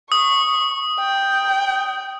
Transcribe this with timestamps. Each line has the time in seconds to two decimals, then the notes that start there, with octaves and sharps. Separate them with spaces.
0.12 C#6 D#6
0.99 G5